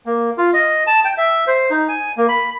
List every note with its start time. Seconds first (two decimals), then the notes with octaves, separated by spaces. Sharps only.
0.06 A#3
0.38 F4
0.54 D#5
0.87 A5
1.05 G5
1.17 E5
1.47 C5
1.70 D#4
1.89 G#5
2.17 A#3
2.29 B5